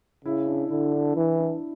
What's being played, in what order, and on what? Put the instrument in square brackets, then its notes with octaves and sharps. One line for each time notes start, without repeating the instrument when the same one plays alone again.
[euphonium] C#3 [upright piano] E4
[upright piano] D4
[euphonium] D3 [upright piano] E4
[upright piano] D4
[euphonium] E3 [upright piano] E4
[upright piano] D4